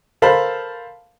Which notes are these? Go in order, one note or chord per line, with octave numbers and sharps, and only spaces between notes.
A4 A#4 C5 F5 A5 B5